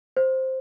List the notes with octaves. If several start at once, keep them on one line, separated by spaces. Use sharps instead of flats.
C5